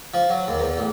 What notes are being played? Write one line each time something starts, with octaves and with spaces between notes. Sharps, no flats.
F3
F#3
D#2
E2
A1